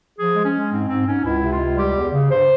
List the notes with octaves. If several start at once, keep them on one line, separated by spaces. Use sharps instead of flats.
F3 G#4
G#3
C#4
G#3
G#2 C4
G#2 C4
G#2 C#4
C#2 E4
C3
F4
C#2
G3 G4
E2
C#3
G2 C5